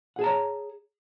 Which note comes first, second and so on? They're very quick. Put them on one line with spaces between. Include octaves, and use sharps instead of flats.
F#5 G#4 A5 A#5 C#5